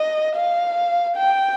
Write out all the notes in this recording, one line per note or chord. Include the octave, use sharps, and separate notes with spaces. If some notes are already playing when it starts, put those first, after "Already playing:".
Already playing: D#5
F5
G5